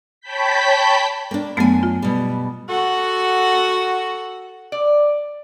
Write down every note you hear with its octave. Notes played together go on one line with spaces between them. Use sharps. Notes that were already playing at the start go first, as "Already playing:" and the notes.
C#5 G5 A5 B5 G6 B6
A#3 D4
F#2 F#3 A3 B3 G#5
F4
B2 G3
F#4 A4 F#5
D5